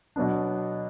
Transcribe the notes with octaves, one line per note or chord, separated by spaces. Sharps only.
B2 F#3 B3 D4